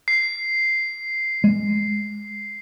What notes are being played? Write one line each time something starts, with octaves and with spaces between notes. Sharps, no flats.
C7
G#3